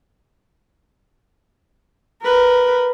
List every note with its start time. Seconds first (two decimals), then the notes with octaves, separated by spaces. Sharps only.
2.22 A#4 B4